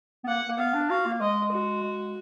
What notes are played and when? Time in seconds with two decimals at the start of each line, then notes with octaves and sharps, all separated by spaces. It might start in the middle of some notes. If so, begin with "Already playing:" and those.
0.24 B3
0.28 A#3 F#5
0.49 A#3
0.59 B3 F5
0.74 D4
0.90 F#4 F5
1.06 A#3
1.20 G#3 D#5
1.52 F#4
1.83 G#3